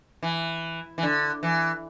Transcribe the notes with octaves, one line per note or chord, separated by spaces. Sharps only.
E3
E3
D3
E3